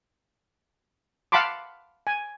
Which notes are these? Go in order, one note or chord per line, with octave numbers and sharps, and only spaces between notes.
F5 F#5 A5 B5 C6 D6
G#5